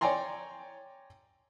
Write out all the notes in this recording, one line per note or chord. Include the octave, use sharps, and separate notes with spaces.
C#5 D5 G5 G#5 A#5 C6